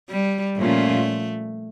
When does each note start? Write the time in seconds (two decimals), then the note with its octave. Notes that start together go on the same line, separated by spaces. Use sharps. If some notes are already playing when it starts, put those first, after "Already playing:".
0.10 G3
0.58 A#2 F3 A3 C#4 F4